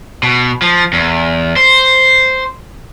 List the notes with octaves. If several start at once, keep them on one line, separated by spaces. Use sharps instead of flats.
B2
F3
E2
C5